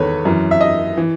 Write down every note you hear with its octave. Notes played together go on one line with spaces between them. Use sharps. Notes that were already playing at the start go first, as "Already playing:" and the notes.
Already playing: E2 D#3 A4 B4 C#5
F#2 E3
E5
D#5
E3